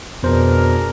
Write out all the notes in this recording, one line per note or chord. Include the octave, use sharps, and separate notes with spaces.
F2 B2 D4 G#4 A#4 C5